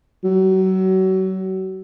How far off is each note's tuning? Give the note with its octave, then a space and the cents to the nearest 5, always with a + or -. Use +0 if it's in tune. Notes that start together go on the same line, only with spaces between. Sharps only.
F#3 +30